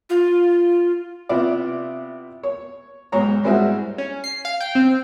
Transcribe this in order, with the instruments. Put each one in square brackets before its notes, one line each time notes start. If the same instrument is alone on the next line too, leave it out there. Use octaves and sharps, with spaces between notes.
[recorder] F4
[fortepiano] C3 B3 E4 F4 D5
C#5
B1 G#2 C#5 A#5
G#2 G3 C4 E4 F#4 G#4
[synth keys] C#4
C7
F5
G5
C4